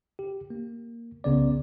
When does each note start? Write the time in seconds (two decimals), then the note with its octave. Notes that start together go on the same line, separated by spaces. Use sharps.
0.19 G4
0.50 A#3
1.24 C2 C#3 B3 D5